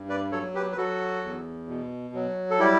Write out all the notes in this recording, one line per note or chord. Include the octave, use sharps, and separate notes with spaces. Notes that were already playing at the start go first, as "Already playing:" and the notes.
Already playing: G2
B4 D5
F#3 A4 C#5
G4 B4
B4
F#3 F#4 A4
E2
B2
F#3
A4
G3 E4 G4